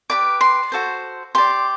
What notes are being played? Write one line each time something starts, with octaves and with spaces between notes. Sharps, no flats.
G4 B4 D5 D6
C6
F#4 A4 C5
G4 D5 C6